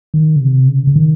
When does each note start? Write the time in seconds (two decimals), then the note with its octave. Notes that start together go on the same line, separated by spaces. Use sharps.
0.14 D#3
0.36 C#3
0.41 C3
0.68 C#3
0.87 C#3
0.96 D#3